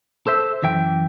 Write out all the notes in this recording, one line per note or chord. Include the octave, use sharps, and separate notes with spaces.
A4 C5 E5
F#2 E3 E5 G5